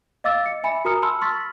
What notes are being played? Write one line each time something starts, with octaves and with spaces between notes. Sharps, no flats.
D#5 F5 D6 E6 A6
C#7
E5 G#5 B5 C#7
F#4 A#4 A#5 D#6 F6 C#7
A5 B5 C6 E6 F6
C6 C#6 E6 F6 A6 B6